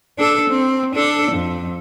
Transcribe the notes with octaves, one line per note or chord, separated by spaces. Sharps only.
D4 A4
C4
D4 A4
F2